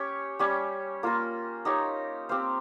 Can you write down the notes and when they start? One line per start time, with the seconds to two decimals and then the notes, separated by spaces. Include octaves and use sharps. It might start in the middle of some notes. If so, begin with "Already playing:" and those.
Already playing: C#4 G4 C#5
0.39 G3 C#4 G4
1.03 A#3 F4 A#4
1.65 D#4 G4 C#5
2.29 C4 G4 C5 F5